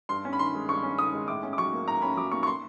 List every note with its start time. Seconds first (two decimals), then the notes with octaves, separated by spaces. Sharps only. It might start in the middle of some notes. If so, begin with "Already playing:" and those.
0.09 G2 C6
0.25 C#4
0.33 B5
0.39 D#3 C6
0.54 G#3
0.69 G2 C#6
0.83 C#4
0.98 D#3 D#6
1.13 G#3
1.28 A2 D6
1.43 C#4
1.53 D6
1.58 F#3 C#6
1.73 A#3
1.87 A2 A#5
2.02 C#4 B5
2.17 F#3 D6
2.31 A#3 C#6
2.43 C#6
2.47 C6